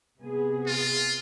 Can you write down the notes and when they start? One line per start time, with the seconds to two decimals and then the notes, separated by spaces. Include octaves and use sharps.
0.18 C3 B3 G#4
0.67 F4